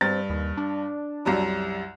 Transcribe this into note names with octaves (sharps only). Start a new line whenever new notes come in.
G2 C4 A6
D#2
D4
C2 F#2 G3